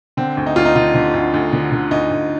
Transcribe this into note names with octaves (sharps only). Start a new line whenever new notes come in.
D3 C4
D2
D#4
D2 F4
D#4
D3 F4
D3
D2
D2
D3
D3
D2 D#4
D2